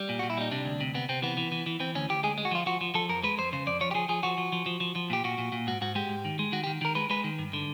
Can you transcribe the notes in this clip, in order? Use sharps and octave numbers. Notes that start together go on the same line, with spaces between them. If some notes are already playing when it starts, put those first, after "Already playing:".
Already playing: G3
A#2
F#4
A#2
E4
G3 D#4
C3 D4
D2
C3
C3 B3
C3 C4
E3 B3
E3
E3
E3
E3 C4
D2 C#4
D2 G4
G#3 G#4
G#3
F#4
F3 F4
F3 F#4
F3
F3 A4
F2 A#4
G#3 B4
F2 C5
C#3 C5
F2 D5
F3 C#5
G4
F3 G#4
F3 G#4
F3 F#4
F3
F3
F3
F3
F3
A#2 G4
A#2 F#4
A#2
A#2
G#2 F#4
G#2 F#4
G#3 G4
G#2
D#3
G#3
D#3 F#4
G4
D#3
D#3 A#4
G#3 B4
G#3 B4
D#3
G2
D3